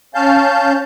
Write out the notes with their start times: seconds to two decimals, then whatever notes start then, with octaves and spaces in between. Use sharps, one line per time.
0.15 C#4 F5 A5 G6